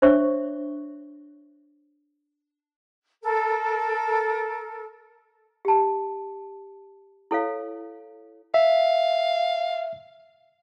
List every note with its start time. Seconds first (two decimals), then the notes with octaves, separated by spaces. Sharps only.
0.02 D4 C5 C#5 E5 C#6
3.23 A4 A#4
5.65 G4 A5
7.31 E4 A4 C#5 F5
8.54 E5 F5